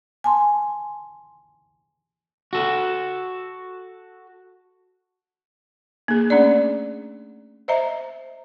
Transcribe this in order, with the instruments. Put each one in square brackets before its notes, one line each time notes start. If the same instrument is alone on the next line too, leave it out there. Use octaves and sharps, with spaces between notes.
[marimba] G#5 A5 C6
[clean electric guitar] F#4 A4
[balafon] A#3 G#4
A3 C#4 D4 D5
C5 D#5 E5 A#5